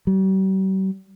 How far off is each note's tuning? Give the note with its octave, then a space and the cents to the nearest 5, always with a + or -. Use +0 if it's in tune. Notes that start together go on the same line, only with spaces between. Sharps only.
G3 -45